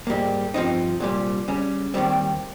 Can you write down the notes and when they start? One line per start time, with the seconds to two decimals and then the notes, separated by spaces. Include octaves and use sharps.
0.07 G#2 G3 A#3
0.54 G2 F3 C4 D#4
1.00 C2 A#2 G3
1.48 C#3 G3 C#4
1.94 D#2 D#3 G3 C4